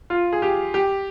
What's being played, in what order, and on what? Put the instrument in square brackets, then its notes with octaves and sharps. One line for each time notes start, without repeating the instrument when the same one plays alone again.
[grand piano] F4
G#4
G4
G4